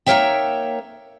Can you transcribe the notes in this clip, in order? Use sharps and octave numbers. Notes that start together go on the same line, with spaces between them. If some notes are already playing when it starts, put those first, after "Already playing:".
A#3 D#4 A#4 C#5 E5 G5